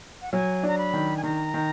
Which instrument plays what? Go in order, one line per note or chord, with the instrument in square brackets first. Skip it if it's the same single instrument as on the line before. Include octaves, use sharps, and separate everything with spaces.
[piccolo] F#5
[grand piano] F#3 [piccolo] G#5
[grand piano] D4 [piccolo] A#5
[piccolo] B5
[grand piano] D#3
[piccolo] G#5
[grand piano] D#3 [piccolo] A#5
[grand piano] D#3